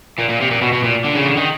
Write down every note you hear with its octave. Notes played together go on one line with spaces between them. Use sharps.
A#2
A#2
C3
A#2
B2
B2
A#2
D3
C#3
D3
D#3